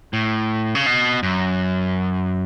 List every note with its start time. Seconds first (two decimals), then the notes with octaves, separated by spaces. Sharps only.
0.13 A2
0.75 C#3
0.86 B2
1.23 F#2